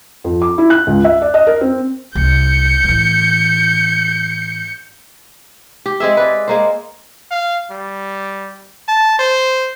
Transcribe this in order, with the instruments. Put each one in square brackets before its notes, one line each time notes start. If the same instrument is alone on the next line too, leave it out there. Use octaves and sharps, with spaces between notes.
[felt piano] F2
D6
E4
F#6
C#2
E5
D5
D#5
A#4
C4
[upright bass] C2 [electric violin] G6 C#7
[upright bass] A2 E3
[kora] G4
G#3 C4 G#4 E5
B4 D5
G#3 A#3 C5
[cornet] F5
G3
A5
C5